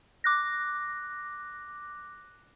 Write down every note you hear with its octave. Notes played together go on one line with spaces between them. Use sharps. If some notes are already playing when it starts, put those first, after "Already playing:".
D6 F#6 A#6